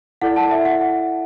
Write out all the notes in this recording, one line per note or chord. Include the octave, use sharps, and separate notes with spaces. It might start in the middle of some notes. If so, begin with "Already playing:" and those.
E4 A4 D5 F#5
A5
E5
F#5